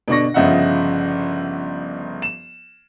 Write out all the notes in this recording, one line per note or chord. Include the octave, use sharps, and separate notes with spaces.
B2 D3 D4 C#6 A#6
G1 C#3 F3 D#5 E5 F#5
E7